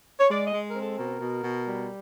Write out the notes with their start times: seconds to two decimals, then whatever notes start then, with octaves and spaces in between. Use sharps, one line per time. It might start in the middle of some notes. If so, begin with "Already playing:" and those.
0.20 C#5
0.30 G#3 D5
0.47 D#5
0.54 G#3
0.70 A#4
0.75 C4
0.81 A4
0.98 B2 A#4
1.20 B2
1.43 B2
1.66 G3